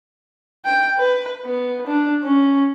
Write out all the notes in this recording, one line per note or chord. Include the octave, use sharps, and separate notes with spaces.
G5
B4
B3
D4
C#4